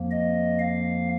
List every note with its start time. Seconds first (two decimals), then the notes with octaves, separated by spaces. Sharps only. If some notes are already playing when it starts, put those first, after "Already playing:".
Already playing: F2 F3 A#3
0.11 D#5
0.59 F5